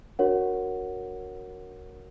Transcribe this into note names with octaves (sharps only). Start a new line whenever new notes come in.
D4 F#4 A#4 C#5 F#5